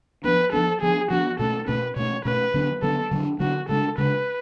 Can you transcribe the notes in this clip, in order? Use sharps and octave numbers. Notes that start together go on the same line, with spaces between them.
F3 B3 D4 B4
F3 B3 D4 A4
F3 B3 D4 G#4
F3 B3 D4 F#4
B2 A3 C#4 A4
B2 A3 C#4 B4
B2 A3 C#4 C#5
B2 A3 C#4 B4
D3 F#3 B3 D4
D3 F#3 B3 D4 A4
D3 F#3 B3 D4
D3 F#3 B3 D4 F#4
C#3 G#3 D4 A4
C#3 G#3 D4 B4